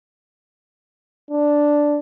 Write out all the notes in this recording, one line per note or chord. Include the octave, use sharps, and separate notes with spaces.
D4